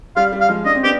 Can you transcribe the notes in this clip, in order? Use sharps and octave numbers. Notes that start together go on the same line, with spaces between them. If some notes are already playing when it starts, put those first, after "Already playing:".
G3 F5
G3
F5
F3 G#3
D4 D#5
C4
B3 D4 G4